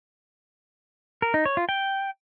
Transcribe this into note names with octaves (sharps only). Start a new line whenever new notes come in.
A#4
D#4
C#5
F4
G5